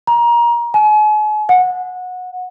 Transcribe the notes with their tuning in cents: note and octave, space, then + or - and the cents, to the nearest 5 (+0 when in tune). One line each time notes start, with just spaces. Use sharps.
A#5 +25
G#5 +40
F#5 -20